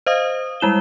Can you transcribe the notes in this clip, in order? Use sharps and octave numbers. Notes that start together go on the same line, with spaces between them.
C5 D#5 F5 D#6
G3 G#3 E4 E7 G7